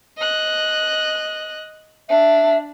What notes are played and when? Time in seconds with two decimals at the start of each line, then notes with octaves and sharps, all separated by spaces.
0.18 D#5 F#6
2.10 D4 E5